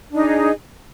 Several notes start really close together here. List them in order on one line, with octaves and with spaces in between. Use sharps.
D4 D#4 G#4